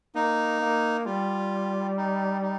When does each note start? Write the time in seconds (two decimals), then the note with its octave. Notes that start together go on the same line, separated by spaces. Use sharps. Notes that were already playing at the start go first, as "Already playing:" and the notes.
0.15 A#3 D#4
0.60 A#3
1.06 G3 F4
1.97 D#4
2.42 D#4